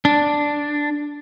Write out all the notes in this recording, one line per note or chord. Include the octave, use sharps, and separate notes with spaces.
D4